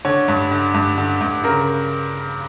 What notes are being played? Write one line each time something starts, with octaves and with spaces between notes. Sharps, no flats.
D3 C#5
G2
D3
G2
D3
G2
C#3 A#4